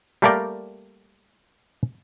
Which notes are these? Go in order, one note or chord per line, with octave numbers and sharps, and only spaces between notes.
G3 A3 A#3 A#4 D5 G5